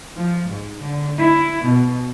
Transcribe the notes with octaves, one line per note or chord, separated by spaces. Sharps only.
F3
G#2
D3
E4
B2